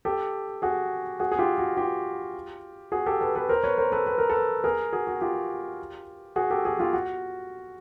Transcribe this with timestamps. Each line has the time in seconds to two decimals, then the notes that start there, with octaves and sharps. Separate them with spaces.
0.05 G4 A4
0.62 F#4 G#4
1.20 F#4 G#4
1.32 G#4
1.39 F4 G4
1.58 F#4
1.77 F4 G4
2.92 F#4 G#4
3.06 G4 A4
3.21 A4 B4
3.35 A4 B4
3.49 A#4 C5
3.64 B4 C#5
3.78 A#4 C5
3.92 A4 B4
4.07 B4
4.18 A#4
4.29 A4 B4
4.64 G#4 A#4
4.93 F#4 G#4
5.07 F#4
5.21 F4 G4
6.36 F#4 G#4
6.50 G4 A4
6.65 F#4 G#4
6.79 F4 G4
6.93 F#4